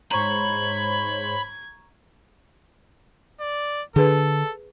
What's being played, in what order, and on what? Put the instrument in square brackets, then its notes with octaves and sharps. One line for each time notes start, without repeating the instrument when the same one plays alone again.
[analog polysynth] G#2 C5 C#5 [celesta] A#5 C#6 [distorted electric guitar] B5 [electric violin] G#6
[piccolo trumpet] D5
[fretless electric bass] D3 [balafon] G#4 B4 [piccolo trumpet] A4